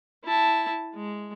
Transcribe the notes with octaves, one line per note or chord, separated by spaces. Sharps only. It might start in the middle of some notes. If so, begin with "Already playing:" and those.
E4 A5
G#3